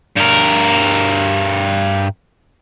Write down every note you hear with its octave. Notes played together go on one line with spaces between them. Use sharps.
G2 A#4